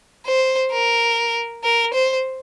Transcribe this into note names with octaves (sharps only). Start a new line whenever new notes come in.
C5
A#4
A#4
C5